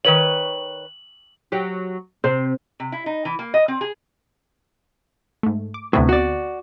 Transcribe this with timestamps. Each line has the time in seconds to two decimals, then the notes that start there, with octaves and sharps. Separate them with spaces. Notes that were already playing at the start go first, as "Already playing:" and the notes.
0.05 D#3 B4 C#5 F#7
1.52 F#3 G4
2.24 C3 C5
2.80 C3
2.92 E4
3.06 D#4
3.25 E3
3.39 A#3
3.54 D#5
3.68 C4
3.81 G#4
5.43 G#2 A3
5.74 D6
5.93 D2 A2 C3 B3 C4
6.09 F#4 D5